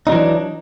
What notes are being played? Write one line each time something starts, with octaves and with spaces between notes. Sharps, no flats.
E3 F#3 D4 D#4